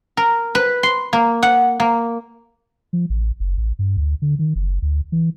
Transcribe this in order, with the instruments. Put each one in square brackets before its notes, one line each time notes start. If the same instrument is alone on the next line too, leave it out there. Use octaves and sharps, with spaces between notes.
[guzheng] A#4
B4
C6
A#3
F#5
A#3
[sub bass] F3
A1
F#1
A1
G2
D2
D3
D#3
F#1
D2
E3